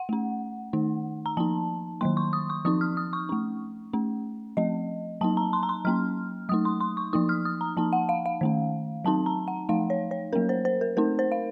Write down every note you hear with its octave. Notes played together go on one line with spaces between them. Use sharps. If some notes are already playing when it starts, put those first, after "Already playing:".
Already playing: F#5
A3 C#4
D#3 A3 D#4
A#5
F3 A#3 D#4 A5
D#3 F#3 A#3 C6
C#6
D#6
C#6
F3 C4 D#4 D#6
F6
D#6
C#6
A3 C#4
A3 C#4
F3 A3 C4 D#5
F#3 A#3 D#4 A5
A#5
C6
A#5
C6
F#3 A#3 C#4 F6
F#3 A3 D#4 D#6
C6
C6
C#6
F3 A#3 D#4 D#6
F6
D#6
A#5
F3 A#3 D#4 A5
F#5
F5
F5
D#3 A3 C#4
F#3 C4 D#4 A5
A#5
F#5
F3 A3 D#4 F5
C#5
C#5
F#3 A#3 C#4 A#4
C5
C5
A#4
A3 C4 D#4 A#4
C5
F5